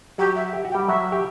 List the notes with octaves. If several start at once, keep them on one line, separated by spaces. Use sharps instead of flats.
F#3 F#4 G4
E5
G4
F#4
G5
G3 G4
F#3 F#4 E5
G4